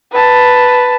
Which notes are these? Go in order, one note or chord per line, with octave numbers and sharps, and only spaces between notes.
B4 A5